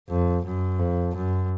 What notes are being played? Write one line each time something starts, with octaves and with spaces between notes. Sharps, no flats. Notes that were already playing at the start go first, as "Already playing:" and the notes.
F2
F#2
F2
F#2